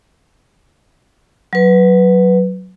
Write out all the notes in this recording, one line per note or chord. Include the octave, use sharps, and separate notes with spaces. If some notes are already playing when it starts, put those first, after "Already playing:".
F#3 B4